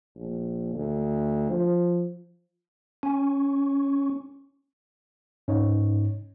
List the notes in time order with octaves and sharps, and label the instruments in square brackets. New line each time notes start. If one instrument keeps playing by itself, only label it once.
[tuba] A#1
D2
F3
[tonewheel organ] C#4
[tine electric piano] G#2 [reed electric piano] C#4 D#4 C#5